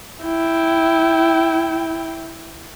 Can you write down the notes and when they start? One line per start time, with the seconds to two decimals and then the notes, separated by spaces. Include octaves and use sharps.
0.24 E4 G5